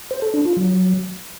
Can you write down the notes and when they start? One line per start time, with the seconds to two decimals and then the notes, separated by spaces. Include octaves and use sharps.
0.11 C5
0.22 A4
0.34 D4
0.45 F4
0.57 F#3